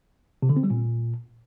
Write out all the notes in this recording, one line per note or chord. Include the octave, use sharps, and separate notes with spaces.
C3
D3
C4
G3
A#2